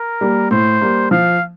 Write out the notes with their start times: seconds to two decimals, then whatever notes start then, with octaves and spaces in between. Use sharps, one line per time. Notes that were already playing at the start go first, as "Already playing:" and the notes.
Already playing: A#4
0.21 G3 A#3
0.51 A2 C5
0.81 G3 A#3
1.11 F3 F5